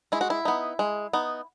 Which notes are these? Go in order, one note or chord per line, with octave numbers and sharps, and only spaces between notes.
G#3 E4
F#4
E4
B3 D#4
G#3
B3 D#4